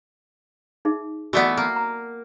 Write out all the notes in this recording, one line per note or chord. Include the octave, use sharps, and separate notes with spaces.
D#4 G#4 E5
E3 A3 B3 F#4 D5 D#5
A#3
A#5